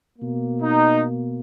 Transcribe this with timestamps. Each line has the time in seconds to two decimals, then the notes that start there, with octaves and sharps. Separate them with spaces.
0.18 B2 A#3
0.63 D#4